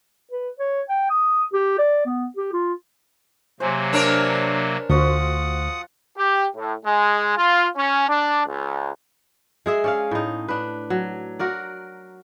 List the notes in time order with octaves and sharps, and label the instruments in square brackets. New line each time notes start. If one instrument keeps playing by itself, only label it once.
[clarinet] B4
C#5
G5
D#6
G4
D5
B3
G4
F4
[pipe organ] C3 F#3 A#3 [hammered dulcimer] C5 G#5
[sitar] D4 A#4 C#5
[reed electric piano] D2 [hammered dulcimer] F3 F#4 C6 [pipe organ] F#5 D#6
[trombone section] G4
A2
G#3
F4
C#4
D4
C#2
[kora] G#3 G#4 E5
C#4 D5 F5
A2 D#4
D4 B4
F#3
F#4 A#4 D5